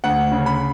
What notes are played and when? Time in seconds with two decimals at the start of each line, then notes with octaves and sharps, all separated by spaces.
0.04 D2 F#5
0.32 C#3
0.46 B5